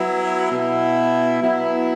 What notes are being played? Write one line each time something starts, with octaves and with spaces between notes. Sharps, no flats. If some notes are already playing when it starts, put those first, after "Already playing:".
Already playing: F#3 B3 E4
B2 B3 E4
F#3 B3 E4